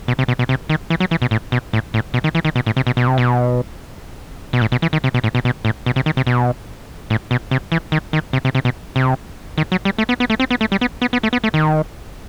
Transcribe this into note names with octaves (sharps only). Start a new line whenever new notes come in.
B2
C3
B2
B2
C3
D#3
E3
F#3
E3
B2
A2
B2
A2
A2
B2
D#3
E3
D#3
B2
A2
C3
B2
B2
C3
B2
B2
A2
B2
E3
D#3
C3
B2
A2
B2
B2
A2
B2
C3
D#3
C3
B2
A2
B2
C3
E3
D#3
D#3
C3
C3
C3
B2
C3
D#3
F#3
G3
A3
B3
B3
A3
C4
B3
A3
G3
B3
B3
B3
A3
B3
A3
D#3